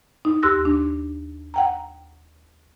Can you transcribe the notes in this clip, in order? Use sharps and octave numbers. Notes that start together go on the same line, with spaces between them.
D#4
D#2 G4 C6 E6 F#6 A#6
D4
F#5 G5 A#5